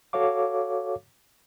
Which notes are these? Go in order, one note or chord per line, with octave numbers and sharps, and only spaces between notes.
F#4 A4 C#5 F5 D6